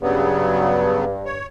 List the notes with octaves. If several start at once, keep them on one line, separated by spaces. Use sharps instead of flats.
G2 C#3 F#3 B3
C#5